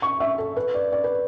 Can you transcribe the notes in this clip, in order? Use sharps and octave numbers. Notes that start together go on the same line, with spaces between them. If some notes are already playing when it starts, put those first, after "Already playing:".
C#6
E5
A4
B4
D5
D5
B4